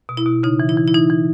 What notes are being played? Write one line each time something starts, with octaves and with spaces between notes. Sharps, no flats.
B2
E4
B2
C#3 D#4
E3
E4
E3
E4
E3 D#4
E3